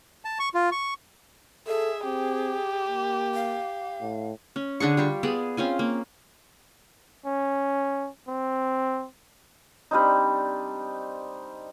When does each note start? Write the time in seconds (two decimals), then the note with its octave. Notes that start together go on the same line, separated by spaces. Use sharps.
0.25 A5
0.39 C#6
0.55 F4
0.72 C#6
1.67 G#4 A4 E5
2.04 C4 G4
2.88 A#3
3.34 F5
4.01 A2
4.56 C#4
4.80 D3 D4 G#4 C#6
4.97 G3 F4 G4 C#6
5.23 B3 G#4 D5
5.57 C4 C#4 F4 G#5
5.79 A#3
7.26 C#4
8.28 C4
9.91 G3 C4 D4 D#4